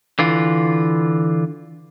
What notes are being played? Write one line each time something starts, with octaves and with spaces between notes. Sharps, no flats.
D3 E3 F4